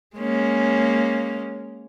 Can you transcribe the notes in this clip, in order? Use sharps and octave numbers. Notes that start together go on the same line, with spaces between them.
G#3 A#3 C#4